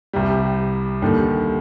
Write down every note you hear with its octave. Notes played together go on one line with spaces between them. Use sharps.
C2 C3 G3
D#2 D3 G3